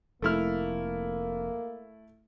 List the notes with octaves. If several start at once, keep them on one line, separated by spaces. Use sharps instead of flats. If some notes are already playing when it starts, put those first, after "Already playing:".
F1 A3 A#3 E4 F6